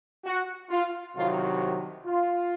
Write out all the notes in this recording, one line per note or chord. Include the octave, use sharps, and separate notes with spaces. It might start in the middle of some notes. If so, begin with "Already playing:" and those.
F#4
F4
C2 C3 D#3 F#3 F4
F4